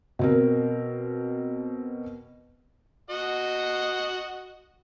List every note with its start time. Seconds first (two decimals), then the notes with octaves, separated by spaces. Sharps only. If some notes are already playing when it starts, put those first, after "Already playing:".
0.19 B2 C4 A#4
3.10 F#4 D#5 F#5